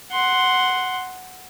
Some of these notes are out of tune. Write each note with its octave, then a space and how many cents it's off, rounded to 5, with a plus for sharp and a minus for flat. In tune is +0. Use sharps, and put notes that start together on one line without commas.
F#5 +0 C6 +0